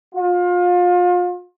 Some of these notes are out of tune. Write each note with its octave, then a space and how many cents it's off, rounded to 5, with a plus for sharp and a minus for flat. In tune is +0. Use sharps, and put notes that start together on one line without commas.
F4 +30